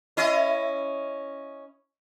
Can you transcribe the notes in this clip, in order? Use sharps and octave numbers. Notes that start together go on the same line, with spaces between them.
C#4 E4 D#5